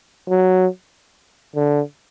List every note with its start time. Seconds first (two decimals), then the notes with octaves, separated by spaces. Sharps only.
0.29 F#3
1.55 D3